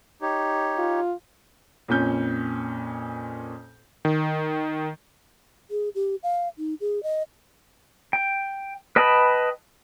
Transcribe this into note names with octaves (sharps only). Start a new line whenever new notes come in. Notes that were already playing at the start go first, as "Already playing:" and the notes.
D#4 G4 C#5
F4
F2 A#2 C#4 G6
D#3
G#4
G4
F5
D#4
G#4
D#5
G5
B4 D#5 G5 A5 B5